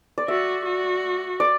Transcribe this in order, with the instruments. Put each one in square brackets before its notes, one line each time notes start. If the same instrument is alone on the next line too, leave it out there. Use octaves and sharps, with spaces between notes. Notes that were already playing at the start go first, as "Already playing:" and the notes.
[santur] D5
[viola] F#4 [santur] E5
[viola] F#4
[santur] D5